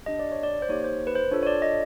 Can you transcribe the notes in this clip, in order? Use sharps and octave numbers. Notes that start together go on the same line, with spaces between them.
D4 G4 D#5
D5
C#5
D5
C5
A#3 D#4 G4 C#5
C5
B4
C5
D4 F4 A4 C#5
C#5
D5
D#5